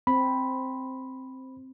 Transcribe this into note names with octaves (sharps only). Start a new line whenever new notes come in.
C4 B5